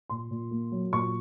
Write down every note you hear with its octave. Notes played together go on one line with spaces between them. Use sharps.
A#2 C6
A#2
A#3
F#3
A#2 C#6